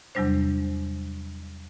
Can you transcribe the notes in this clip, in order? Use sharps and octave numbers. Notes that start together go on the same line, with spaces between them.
E2 C3 F#3 G3 D4 C5